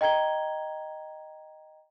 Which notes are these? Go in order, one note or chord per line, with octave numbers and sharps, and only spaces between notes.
D#5 G5 A#5 G#6 G7